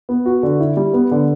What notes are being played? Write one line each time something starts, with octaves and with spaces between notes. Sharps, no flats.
B3
F#4
D3
E4
G3
B3
D3